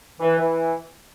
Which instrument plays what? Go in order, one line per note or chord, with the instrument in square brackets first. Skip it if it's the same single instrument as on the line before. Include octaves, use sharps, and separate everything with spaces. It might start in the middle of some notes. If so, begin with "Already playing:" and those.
[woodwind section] E3
E3